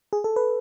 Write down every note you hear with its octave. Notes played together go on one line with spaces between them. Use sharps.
G#4
A4
B4